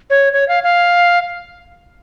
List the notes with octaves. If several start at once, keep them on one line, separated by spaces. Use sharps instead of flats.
C#5
C#5
F5
F5